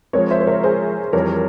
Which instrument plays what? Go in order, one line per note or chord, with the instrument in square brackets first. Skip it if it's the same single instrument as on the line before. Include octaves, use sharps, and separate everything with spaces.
[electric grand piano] F3 G#3 C4 [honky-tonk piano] A#4 C#5
[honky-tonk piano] C5 E5
C5
A#4 C#5
G#4 C5
[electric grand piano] F2 E3 G3 [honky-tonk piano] A#4 C#5